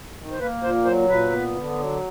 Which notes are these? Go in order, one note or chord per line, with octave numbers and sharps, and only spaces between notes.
D#3
C5
A#3 B4
A#2 C5
F#3 C5
A#2 B4
B3
D3
F#3